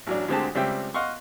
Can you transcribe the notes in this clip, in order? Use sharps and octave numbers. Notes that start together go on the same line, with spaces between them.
A1 F#3 D4
D2 D3 G#3 C4 G4 A5
C#2 G3 C4 E5 G5
D#5 F5 F#5 C6 C#6